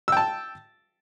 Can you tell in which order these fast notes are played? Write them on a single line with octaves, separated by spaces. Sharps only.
E6 G5 A5